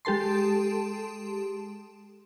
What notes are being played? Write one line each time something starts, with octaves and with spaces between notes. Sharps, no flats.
G#3 G4 A4 A5 C6